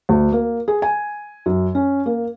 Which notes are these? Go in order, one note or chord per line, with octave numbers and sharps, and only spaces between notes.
D2
A#3
G#4
G#5
F#2
C#4
A#3